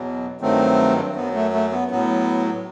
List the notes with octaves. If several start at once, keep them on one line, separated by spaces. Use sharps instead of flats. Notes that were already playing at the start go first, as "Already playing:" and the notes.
Already playing: E2 B2 F#3
G2 D#3 F#3 A3 C4
F#2 F#3 B3
A3
A3
B3
A2 F#3 B3